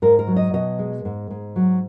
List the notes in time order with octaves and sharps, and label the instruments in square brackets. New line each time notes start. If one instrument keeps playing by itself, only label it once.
[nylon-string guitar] G#2 A#4
A#4
F#3
D#5
B2 D#5
G#3
G#2
G#2
F#3